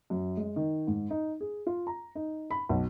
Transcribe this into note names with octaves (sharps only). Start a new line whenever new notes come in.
F#2
G#3
D#3
G#2
D#4
G#4
F4
A#5
D#4
B5
B1